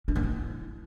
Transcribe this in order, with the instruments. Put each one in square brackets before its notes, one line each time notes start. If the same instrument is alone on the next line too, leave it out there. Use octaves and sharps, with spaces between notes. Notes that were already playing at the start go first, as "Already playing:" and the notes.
[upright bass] D4
A#3
E4